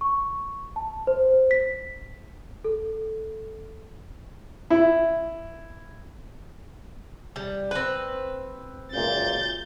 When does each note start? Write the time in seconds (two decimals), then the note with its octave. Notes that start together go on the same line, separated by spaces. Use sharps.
0.01 C#6
0.76 A5
1.07 C5
1.51 B6
2.64 A4
4.70 E4
7.36 G3
7.71 C4 B4
8.93 C#2 F#2 A#2 G6 A6